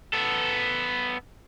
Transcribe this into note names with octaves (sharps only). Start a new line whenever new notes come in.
B3 A4